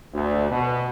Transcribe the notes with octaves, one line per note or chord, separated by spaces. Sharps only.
D2
B2